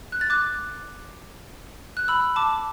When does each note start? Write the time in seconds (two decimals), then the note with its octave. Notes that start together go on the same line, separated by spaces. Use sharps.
0.12 F#6
0.21 A6
0.30 D6 F#6
1.97 F#6
2.08 B5 E6
2.36 A5 D6